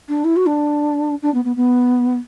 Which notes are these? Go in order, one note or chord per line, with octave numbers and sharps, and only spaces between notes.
D4
E4
F#4
D4
D4
B3
B3
B3